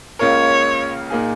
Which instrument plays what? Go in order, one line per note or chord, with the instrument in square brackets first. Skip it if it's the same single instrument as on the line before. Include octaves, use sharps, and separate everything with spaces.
[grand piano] C#2 C#3 A#3 F4 A#4 [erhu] C#5
[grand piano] A#2 A#3 D#4 G#4